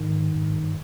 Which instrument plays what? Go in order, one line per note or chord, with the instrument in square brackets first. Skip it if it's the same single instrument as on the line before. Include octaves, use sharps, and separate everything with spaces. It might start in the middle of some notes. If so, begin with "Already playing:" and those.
Already playing: [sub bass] G#2 [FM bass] D#3
[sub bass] G2
G#2
G2